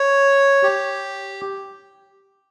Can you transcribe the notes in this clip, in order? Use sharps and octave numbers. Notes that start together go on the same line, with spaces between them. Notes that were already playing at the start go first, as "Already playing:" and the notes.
Already playing: C#5
G4